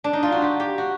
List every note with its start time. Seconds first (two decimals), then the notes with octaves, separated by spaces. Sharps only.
0.04 D4
0.13 D#4
0.23 F4
0.32 F#4
0.42 G4
0.60 G4
0.78 F#4